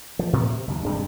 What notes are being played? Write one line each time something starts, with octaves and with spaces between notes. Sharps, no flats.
F3
A2 C3 D#3 B3
C3
F#1 D#2
D#1 G2 C3 G#3